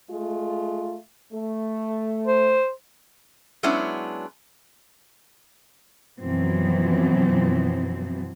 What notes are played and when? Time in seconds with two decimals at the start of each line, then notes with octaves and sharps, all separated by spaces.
0.10 G#3 A3 F4
1.32 A3
2.27 C5
3.63 F#3 G#3 B3 C#4 D4 E4
6.20 F#2 B2 E3 F3 B3 C4